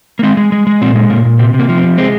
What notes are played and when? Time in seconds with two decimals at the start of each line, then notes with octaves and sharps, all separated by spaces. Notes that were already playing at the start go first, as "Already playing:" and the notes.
0.19 A#3
0.23 G#3 C4
0.37 G#3
0.52 G#3
0.67 G#3
0.81 A#2 C4
0.96 G#3
1.10 A#2 A#3
1.25 A#2
1.39 C3 C4
1.54 C3
1.59 A#3
1.69 F3
1.78 C4
1.84 C3
1.97 G#3 C4